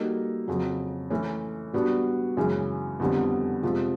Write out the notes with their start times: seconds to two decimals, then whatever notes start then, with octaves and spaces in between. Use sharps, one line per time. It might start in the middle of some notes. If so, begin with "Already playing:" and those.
Already playing: G3 A#3 D#4 F#4 A4
0.48 F2 C#3 F#3
1.10 E3 A3 C#4
1.73 G3 B3 D4 F#4
2.37 F#2 C#3 E3 G#3 C#4
3.00 F2 D3 G3 B3
3.63 F2 C3 F3 G#3